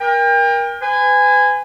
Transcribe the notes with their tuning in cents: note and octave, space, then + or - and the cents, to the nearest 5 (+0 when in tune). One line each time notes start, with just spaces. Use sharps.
A#4 +25 G5 +35
B4 +40 G#5 -15